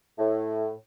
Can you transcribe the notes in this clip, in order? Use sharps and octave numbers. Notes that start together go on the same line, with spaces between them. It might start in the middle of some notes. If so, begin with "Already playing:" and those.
A2